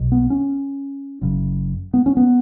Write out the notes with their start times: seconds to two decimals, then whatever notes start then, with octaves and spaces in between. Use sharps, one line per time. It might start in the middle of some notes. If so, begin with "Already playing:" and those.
Already playing: B1 B2
0.12 B3
0.30 C#4
1.21 F#1 F#2 C#3
1.94 B3
2.06 C#4
2.17 B3